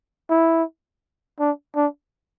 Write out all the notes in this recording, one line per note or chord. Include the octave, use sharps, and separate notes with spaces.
E4
D4
D4